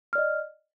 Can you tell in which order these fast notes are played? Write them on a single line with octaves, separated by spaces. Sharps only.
F6 D5 D#5